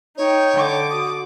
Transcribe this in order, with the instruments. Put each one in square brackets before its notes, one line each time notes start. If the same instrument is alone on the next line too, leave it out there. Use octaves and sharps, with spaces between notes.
[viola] D#4 G5 [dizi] C#5
[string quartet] D3 D6
[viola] F#4 [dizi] D#6